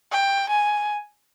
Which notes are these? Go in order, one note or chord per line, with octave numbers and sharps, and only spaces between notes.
G5
G#5